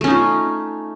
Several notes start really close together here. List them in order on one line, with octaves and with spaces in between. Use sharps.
A3 C#4 D#4 F4